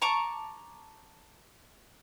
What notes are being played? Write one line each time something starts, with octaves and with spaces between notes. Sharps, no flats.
A5 A#5 C#6 D6